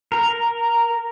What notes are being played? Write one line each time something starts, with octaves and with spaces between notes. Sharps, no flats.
A#4